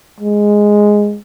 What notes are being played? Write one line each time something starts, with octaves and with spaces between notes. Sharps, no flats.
G#3